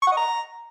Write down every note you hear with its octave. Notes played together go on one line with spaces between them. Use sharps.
C#6
F#5
D#5
A#5